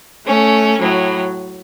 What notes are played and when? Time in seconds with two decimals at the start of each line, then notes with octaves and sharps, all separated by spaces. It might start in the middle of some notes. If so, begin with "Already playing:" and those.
0.26 A3 C#4
0.81 A2 F#3